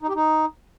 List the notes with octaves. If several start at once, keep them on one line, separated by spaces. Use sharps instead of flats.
D#4
G4
D#4